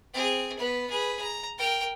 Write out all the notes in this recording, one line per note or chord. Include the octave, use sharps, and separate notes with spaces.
C4 G#4
B3 B4
G#4 B4
A#5
A#4 G5